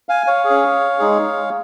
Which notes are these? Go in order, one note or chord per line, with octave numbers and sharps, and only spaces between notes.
F5 G#5
C#5 F5
G#4
C#4
G#3 D#4 G#4